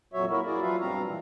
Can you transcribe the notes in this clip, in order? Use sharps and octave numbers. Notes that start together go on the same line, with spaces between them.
F2 A#2 F#3 F#4 C#5 E5
A#3 E4 F#4 A#4
E4 F#4 G#4 A#4 D5
F3 F#3 F4 B4 E5 F5
G2 B2 G3 C4 F5 A#5
A#2 E3